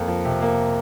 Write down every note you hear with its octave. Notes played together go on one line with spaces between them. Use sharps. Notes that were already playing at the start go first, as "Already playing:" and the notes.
Already playing: F2 A#3 F5
F3
C3
A#3